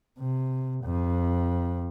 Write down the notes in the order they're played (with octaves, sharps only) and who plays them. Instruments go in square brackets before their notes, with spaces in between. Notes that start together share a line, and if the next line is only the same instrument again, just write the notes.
[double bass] C3
F2